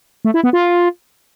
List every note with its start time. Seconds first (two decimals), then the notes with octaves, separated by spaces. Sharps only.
0.25 A3
0.34 E4
0.44 B3
0.53 F4